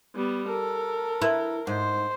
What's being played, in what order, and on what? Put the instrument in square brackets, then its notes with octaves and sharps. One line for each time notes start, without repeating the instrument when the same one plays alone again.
[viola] G3 B3
[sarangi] A4 [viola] A#4
[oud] E4 B4
[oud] G#2 [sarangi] C5